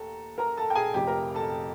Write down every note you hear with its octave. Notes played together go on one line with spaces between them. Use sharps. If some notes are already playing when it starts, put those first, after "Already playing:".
Already playing: D#2 A4 A#5
A#4 A#5
A4 A5
G5
G#4 G#5
F1 F2 C3 G4 G5
A#4 A#5
A4 A5